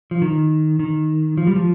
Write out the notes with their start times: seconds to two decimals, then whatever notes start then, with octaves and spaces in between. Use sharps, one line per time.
0.11 F3
0.22 D#3
0.79 D#3
1.37 F3
1.47 G3
1.56 F3